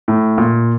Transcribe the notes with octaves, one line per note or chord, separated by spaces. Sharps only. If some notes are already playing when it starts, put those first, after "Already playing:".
A2
A#2